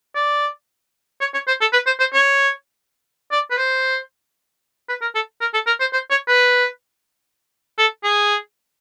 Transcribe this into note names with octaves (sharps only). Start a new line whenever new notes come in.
D5
C#5
C#5
C5
A4
B4
C5
C5
C#5
D5
B4
C5
B4
A#4
A4
A#4
A4
A#4
C5
C5
C#5
B4
A4
G#4